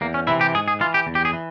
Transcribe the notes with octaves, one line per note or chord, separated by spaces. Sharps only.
E2 A#3
C#4
C3 E3 E4
G4
G#2 G#4
G#4
E3 F4
G4
E2
G4
G#4
E3